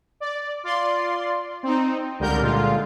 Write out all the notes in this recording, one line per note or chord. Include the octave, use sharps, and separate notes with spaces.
D5
F4 D5 C6
C4 D#4
C#2 D3 G3 A#4 G6
A#2 D3 G#3 F4